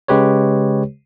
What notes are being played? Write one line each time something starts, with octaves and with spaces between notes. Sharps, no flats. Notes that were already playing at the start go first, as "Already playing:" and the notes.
C#3 G#3 G4 B4 C#5